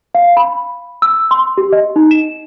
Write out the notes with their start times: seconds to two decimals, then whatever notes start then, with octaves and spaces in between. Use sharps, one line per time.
0.15 F5
0.37 B5
1.02 E6
1.31 C6
1.57 G4
1.72 D#5
1.96 D#4
2.11 E7